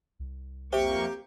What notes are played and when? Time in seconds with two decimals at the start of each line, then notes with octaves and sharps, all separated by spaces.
0.19 C2
0.73 F2 A#3 G4 C5 E5 C#6